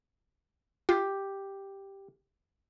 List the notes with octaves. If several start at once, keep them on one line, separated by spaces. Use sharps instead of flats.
F4 G4